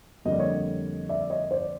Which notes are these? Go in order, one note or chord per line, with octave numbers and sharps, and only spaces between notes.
F2 D3 G3 A#3 D#5
D5
C#5 D#5
D5 E5
C#5 D#5
C5 D5